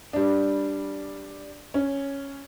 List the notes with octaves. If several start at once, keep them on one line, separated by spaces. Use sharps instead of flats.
G3 D4
C#4